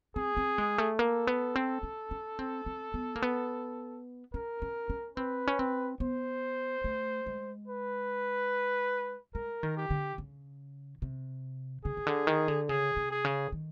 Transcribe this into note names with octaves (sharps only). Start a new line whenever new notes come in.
C4 G#4
C4
G#3
A3
A#3 A4
B3
C4
C#4
C#4
C4
C4
B3
A#3
B3
C#4 A#4
C#4
C#4
C4 B4
C#4
C4
B3 C5
A3
G#3
B4
G#3 A#4
D#3
G4
D3
C#3
C3
C#3 G#4
C#3
D3
D#3
D3
C#3 G#4
C3
G#4
C#3
D#3